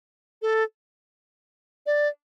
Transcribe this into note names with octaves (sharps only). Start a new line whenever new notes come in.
A4
D5